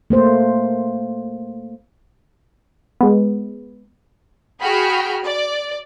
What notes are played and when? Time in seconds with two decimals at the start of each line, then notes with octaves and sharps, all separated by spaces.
0.10 A3 A#3 C5
3.01 G#3 B3
4.62 F#4 G#4 G5 B5 F6
5.24 D5